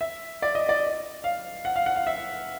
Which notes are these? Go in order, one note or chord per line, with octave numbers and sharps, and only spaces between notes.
E5
D5
D#5
D5
F5
F#5
F5
F#5
F5
E5